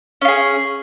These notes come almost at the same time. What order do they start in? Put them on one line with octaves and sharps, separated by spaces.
C#4 F4 G#4